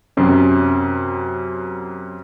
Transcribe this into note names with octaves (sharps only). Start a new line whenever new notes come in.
F#2 C3 C#4